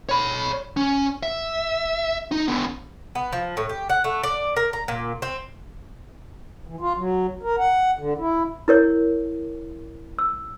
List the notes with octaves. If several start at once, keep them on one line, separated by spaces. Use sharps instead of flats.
C#5 B5
C#4
E5
D#4
D3 B3
B3
F3
A2
G4
F#5
A3
D5
A#4
A#5
A#2
C4
E3
F4
F#3
A#4
F#5
D3
E4
E4 A#4 C#5
E6